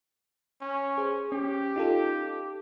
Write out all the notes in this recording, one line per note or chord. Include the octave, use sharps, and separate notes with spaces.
C#4
G#4 C5
C#4 G4
D#4 F4 A4